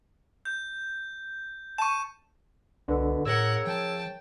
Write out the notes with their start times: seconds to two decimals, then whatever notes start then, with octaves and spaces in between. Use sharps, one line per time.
0.45 G6
1.78 A5 C#6 D#7 E7
2.88 C2 B2 D3
3.25 A2 C#3 A#4 F#5 E6 G#6
3.66 F3 G5 A5